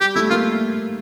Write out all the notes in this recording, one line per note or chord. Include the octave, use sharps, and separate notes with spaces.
G3 G4
A3 E4
A#3 F4